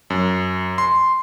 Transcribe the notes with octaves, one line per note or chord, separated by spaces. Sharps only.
F#2
C6